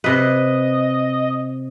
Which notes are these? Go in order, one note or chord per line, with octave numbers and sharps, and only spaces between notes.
C3 B4 D#5